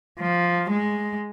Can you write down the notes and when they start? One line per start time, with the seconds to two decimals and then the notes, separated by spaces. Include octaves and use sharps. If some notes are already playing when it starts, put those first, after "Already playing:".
0.20 F3
0.70 G#3